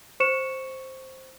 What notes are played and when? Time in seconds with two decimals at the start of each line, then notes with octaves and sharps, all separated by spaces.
0.20 C5 C#6 C#7 E7